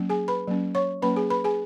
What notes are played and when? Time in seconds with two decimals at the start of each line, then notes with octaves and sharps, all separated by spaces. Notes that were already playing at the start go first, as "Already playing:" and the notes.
Already playing: F#3 A#3 C#4
0.09 G#4 G#5
0.28 B4 B5
0.47 F#3 A#3 C#4
0.75 C#5 C#6
1.02 F#3 A#3 C#4 B4 B5
1.16 G#4 G#5
1.30 B4 B5
1.44 G#4 G#5